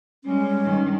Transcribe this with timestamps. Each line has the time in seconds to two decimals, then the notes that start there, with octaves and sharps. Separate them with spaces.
0.24 G3 G#3 C#4
0.63 G2 D#3